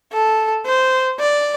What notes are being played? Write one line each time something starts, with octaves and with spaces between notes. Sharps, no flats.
A4
C5
D5